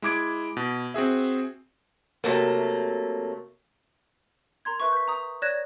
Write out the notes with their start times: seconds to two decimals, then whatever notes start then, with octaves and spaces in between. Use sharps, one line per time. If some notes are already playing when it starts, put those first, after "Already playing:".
0.02 G#3 E4 D6 G#6 D7
0.57 B2
0.94 C4 F#4 G#4 E5
2.24 C3 F#3 A3 A#3
4.65 A#4 A#5 C6 G#6
4.80 B4 E5 C#6
4.93 G6 B6
5.08 A#5 D#6
5.42 C#5 D5 F#6 G#6 A#6 E7